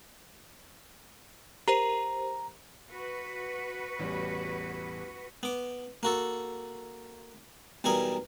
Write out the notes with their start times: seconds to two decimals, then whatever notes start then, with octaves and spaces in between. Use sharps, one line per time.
1.68 G4 A#4 C5 A#5
2.89 F#4 B4
3.99 A1 E2 G3
5.43 B3 D6
6.03 A#3 F#4 A4
7.84 B1 E3 G3 A#4 G#5 D#6